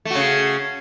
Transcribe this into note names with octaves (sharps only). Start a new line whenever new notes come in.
C#3 A3 F#4